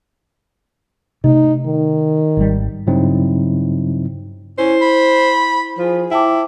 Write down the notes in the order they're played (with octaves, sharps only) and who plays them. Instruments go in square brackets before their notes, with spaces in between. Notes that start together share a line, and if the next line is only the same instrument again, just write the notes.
[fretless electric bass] C3 A3 [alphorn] D#4
[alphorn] D#3
[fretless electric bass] G#1 C#3 G3
[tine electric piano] G2 C#3 F#3 C4 D#4 E4
[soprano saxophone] C#4 [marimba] E4 [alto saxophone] C5
[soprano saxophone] B5
[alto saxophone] F3 [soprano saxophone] G#4 [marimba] C5
[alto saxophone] E4 [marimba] G5 A5 D6